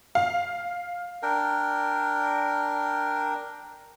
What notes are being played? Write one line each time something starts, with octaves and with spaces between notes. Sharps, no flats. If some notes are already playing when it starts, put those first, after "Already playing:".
F5
D4 A#4 G5